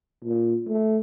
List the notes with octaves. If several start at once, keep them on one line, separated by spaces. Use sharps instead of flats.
A#2
A3